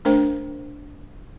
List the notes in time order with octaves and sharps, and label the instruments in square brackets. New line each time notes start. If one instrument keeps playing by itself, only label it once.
[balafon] A3 D4 A#4 C5 G5